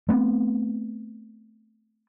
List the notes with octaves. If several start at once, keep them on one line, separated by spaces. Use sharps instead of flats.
A3 B3 C4